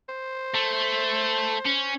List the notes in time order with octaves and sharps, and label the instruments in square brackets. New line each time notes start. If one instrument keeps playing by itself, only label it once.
[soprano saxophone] C5
[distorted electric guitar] A3
C#4